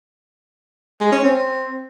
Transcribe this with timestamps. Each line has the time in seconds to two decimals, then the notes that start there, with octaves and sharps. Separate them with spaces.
1.01 G#3
1.12 C#4
1.24 C4